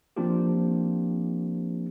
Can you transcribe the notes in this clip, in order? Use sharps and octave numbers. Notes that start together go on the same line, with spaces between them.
F3 A#3 C4 D4 F4 G4